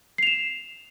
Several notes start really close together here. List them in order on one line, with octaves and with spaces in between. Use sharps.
C7 F7 E7